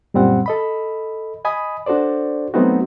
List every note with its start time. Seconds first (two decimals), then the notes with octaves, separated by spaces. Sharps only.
0.14 F#2 A#2 G3 C4 F#5
0.46 A4 D#5 B5
1.45 D#5 G#5 B5 D#6
1.86 D4 F#4 A4 C5 D5
2.54 F#3 A3 B3 C4 D#4 F#4